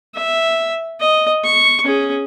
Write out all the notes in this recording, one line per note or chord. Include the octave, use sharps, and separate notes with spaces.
E5
D#5
C#6
C#4 G#4